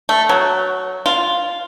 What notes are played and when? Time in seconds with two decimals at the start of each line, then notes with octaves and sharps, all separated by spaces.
0.09 A3
0.29 F#3
1.06 F4